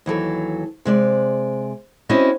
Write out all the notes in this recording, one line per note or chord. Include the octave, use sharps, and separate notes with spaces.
D#2 E3 F#3 A4
C3 G#3 D5
C4 C#4 E4 F#4 D#5